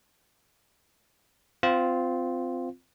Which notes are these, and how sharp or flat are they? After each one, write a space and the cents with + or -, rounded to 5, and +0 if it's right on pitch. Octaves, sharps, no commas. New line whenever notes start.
C4 -20 F4 +0